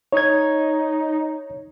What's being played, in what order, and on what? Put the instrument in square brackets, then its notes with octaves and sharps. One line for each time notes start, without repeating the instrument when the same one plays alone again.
[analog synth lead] D#4 [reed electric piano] C#5 G#6